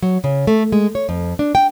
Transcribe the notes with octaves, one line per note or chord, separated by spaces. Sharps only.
F#3
C#3
A3
G#3
C#5
F2
D4
G5